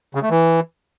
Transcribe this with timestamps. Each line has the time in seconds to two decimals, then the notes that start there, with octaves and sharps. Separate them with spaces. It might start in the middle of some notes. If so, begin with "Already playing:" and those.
0.15 C#3
0.23 A3
0.30 E3